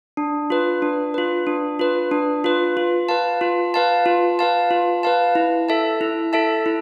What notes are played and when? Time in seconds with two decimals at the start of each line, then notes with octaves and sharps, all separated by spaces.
0.17 D4
0.50 F4 B4
0.82 D4
1.14 F4 B4
1.47 D4
1.79 F4 B4
2.11 D4
2.44 F4 B4
2.77 F4
3.09 B4 F5 A5
3.41 F4
3.74 B4 F5 A5
4.06 F4
4.39 B4 F5 A5
4.71 F4
5.03 B4 F5 A5
5.35 E4
5.69 A4 E5 A5
6.01 E4
6.33 A4 E5 A5
6.66 E4